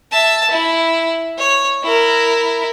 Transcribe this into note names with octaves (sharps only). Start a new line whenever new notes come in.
E5 A5
E4
C#5
E4 A#4